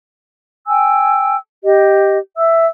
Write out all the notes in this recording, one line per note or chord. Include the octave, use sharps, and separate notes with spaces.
G5 G#5 E6
G4 D#5
E5 E6